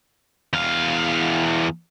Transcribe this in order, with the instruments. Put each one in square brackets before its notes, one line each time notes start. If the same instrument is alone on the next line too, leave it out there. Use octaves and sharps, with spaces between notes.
[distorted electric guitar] E2 F5